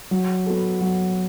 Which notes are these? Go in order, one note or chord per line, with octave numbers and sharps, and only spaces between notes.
F#3
B3 F#4 A4
F#3